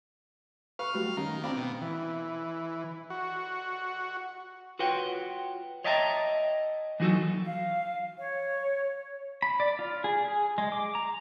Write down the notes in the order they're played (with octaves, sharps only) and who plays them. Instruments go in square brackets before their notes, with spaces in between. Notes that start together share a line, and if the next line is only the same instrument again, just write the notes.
[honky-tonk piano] B4 [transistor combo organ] F5 [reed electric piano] C#6 F6
[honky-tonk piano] F#3 G3 [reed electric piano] A3 F#4
[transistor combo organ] D#3 [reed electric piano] C#4 [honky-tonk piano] A#5
[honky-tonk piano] C4 [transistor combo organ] D4 [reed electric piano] F5 B5
[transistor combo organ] B2
E3
F#4
[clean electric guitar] F4 F#4 B4 C#5 F#5 G5
C#5 D#5 E5 G5 A5 A#5
E3 F#3 D#4 F#4 A4
[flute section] F5
C#5
[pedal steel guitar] B5
D5
F4
G#4
G#4
G#3
D6
A#5